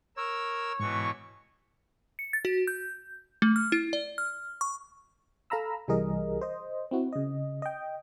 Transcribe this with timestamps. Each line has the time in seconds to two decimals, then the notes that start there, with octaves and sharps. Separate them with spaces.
0.17 A#4 C#5 E6
0.80 G#2 B2 E3 C#6
2.19 C#7
2.33 A6
2.45 F#4
2.67 G6
3.42 A3
3.56 F6
3.72 E4
3.93 D5
4.18 F6
4.61 C#6
5.50 A4 F5 A#5 B5 E6
5.88 C2 E3 G3 G#4 A#4 D#5
6.41 C5 D#5
6.91 C4 E4 F#4
7.13 C#3 D#5
7.62 D#5 G5